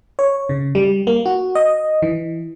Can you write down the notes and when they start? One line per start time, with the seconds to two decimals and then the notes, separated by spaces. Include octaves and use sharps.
0.19 C#5
0.49 C#3
0.75 G3
1.07 A#3
1.26 F#4
1.55 D#5
2.02 E3